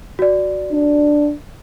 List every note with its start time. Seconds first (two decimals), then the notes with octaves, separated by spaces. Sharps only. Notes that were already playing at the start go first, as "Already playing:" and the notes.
0.19 F#4 D5
0.72 D4